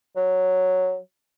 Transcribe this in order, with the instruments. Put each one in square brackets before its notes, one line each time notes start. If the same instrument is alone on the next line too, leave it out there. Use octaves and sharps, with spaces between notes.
[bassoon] F#3